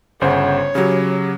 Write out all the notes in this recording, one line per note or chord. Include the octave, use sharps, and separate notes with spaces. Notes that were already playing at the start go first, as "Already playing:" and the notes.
G1 C#3 C5 C#5 F#5
C#3 F#3 G4